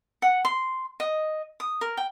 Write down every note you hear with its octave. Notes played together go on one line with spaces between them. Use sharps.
F#5
C6
D#5
D#6
A#4
G5